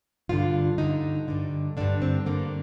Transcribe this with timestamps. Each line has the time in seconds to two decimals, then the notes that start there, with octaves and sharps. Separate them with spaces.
0.29 G2 D3 F4
0.78 G2 D3 D#4
1.28 G2 D3
1.77 G2 D3 D4
2.02 C4
2.26 G2 D3 A#3